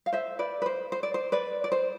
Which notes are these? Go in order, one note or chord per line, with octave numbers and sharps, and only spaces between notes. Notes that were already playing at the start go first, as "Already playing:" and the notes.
F5
C5 E5
B4 D5
B4
C5
C5
D5
C5
B4 D5
D5
C5